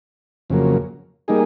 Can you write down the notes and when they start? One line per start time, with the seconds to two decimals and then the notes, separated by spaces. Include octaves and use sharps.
0.50 F2 C#3 F#3 A#3
1.28 G3 A#3 D#4 G#4